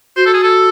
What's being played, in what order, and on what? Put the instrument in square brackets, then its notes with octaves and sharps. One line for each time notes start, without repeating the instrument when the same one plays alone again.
[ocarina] F#4 [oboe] C5
[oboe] A4
G#4
A4